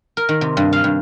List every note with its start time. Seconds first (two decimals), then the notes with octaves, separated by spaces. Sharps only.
0.17 A#4
0.29 D#3
0.41 C3
0.57 G2
0.73 F5
0.84 G2